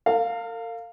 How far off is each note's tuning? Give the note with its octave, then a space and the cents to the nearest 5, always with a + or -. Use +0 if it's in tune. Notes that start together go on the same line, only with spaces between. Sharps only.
A#4 -45 F5 +0